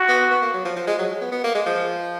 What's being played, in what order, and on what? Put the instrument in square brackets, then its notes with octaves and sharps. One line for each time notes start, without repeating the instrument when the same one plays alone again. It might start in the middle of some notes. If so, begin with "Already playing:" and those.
Already playing: [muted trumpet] F#4
[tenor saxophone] B3
B3
A#3
F#3
F3
F3
G#3
F#3
B3
B3
A#3
G#3
F3